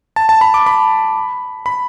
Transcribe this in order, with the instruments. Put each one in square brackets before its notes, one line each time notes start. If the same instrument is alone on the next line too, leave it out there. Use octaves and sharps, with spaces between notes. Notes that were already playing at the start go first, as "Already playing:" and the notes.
[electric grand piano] A5
A5
B5
D6
B5
B5